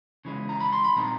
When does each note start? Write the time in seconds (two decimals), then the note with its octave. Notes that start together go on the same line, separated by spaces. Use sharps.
0.25 C#3 E3 G#3 C#4
0.49 A#5
0.60 B5
0.73 C6
0.84 B5
0.96 A#2 G3 C4 D#4 A#5